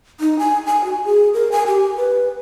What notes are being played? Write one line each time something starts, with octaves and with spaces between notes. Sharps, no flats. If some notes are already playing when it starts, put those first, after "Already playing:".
D#4
G#5
G#5
F#4
G#4
A#4
G#5
G4
B4